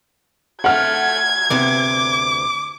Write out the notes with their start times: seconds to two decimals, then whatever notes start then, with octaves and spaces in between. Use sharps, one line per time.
0.64 A3 F#5 F6 G#6
1.50 D2 C3 B3 D6